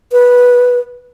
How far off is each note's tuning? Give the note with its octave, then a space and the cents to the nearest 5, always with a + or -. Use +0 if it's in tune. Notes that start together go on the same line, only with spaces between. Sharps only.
B4 -10